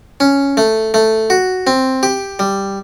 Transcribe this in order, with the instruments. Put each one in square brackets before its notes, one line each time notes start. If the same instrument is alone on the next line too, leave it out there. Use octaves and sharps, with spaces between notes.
[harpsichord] C#4
A3
A3
F#4
C4
G4
G3